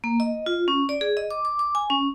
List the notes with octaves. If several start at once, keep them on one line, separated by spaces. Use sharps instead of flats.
A#3
D#5
F4
C#4
D5
G#4
D#5
D6
D6
D6
G#5
C#4